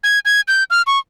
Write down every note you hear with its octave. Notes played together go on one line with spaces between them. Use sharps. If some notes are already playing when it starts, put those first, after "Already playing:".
G#6
G#6
G6
F6
C#6